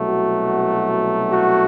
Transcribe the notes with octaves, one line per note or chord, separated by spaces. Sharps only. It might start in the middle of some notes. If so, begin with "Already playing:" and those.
Already playing: C2 B2 F#3 A3
F#4
F#4